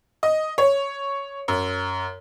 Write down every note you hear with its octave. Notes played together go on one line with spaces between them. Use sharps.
D#5
C#5
F#2